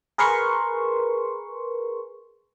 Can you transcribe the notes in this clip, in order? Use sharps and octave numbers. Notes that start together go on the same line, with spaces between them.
G#4 A#4 B4 C6 C#6